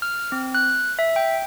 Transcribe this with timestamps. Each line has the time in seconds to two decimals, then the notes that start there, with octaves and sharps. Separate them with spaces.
0.02 F6
0.32 C4
0.55 F#6
0.99 E5
1.16 G5